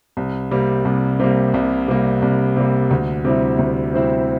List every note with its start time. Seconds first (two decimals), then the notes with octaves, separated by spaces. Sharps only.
0.17 C2
0.51 C3 G3 A#3
0.85 C2
1.19 C3 G3 A#3
1.54 C2
1.88 C3 G3 A#3
2.22 C2
2.56 C3 G3 A#3
2.91 D2
3.25 C3 G3 C4 E4
3.59 D2
3.93 C3 G3 C4 E4